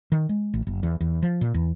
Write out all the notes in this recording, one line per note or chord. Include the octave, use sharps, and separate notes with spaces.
D#3
G#3
A1
F#1
E2
E2
F3
A#2
E2